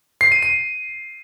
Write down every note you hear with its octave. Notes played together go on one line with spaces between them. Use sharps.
C7
D#7
D#7